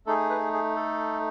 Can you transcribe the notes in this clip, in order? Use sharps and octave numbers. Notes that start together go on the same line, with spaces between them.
A3 D#4 G#4 A4
B4
G#4
A4